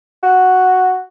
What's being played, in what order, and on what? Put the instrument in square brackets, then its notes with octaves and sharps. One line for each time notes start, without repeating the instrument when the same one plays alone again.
[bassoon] F#4